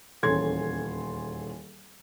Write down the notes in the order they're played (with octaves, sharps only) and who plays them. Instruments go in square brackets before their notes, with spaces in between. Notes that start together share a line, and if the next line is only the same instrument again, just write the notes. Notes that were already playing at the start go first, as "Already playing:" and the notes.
[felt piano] D#1 E2 C#4 A4 C6 G#6